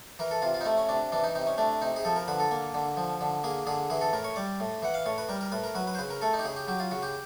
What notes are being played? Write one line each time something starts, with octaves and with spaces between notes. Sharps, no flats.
E3 A#4
A4
C3 F4
F4
D#4
A3 E4
C#4
C3 D4
E3 D4
D#4
C3 D#4
C#4
A3 D4
C3 D#4
G#4
F3 A4
A#4
D3 B4
A4
A#3
D3
F3
D3
A#3 G#4
D3 G#4
E3 G#4
A4
A2 A#4
C#5
G3 D5
A2
E3 F#5
F5
A2 C#5
B4
G3 A#4
A#4
A2 B4
A#4
F#3 B4
B4
C5
C#3 B4
A#4
A3 A4
D#4
G4
C#3 G#4
G4
F#3 G4
F4
C#3 F#4
G4